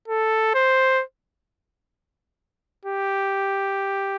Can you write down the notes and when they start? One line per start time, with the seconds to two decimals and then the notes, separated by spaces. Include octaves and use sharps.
0.08 A4
0.55 C5
2.85 G4